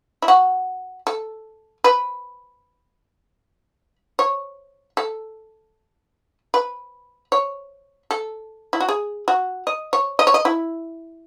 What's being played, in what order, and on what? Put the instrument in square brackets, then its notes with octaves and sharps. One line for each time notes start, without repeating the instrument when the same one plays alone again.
[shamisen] E4
F#4
A4
B4
C#5
A4
B4
C#5
A4
E4
F#4
G#4
F#4
D#5
C#5
D#5
C#5
D#5
E4